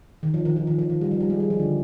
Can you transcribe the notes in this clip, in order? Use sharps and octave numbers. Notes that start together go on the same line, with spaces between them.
D#3
F3
D#3
F3
D#3
F3
D#3
G3
F3
G3
G#3
G3
F3
D3